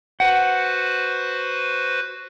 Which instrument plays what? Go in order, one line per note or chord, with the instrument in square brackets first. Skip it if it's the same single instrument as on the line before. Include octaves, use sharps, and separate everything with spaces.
[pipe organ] F#4 B4 C5 [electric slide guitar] F#5